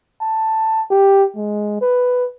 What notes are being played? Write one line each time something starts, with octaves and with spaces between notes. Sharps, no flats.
A5
G4
G#3
B4